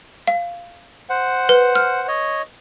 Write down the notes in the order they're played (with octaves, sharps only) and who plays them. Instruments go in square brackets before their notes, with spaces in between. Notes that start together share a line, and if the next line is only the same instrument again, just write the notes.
[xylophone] F5
[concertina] C5 F#5
[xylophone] B4
F6
[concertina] C#5 D#5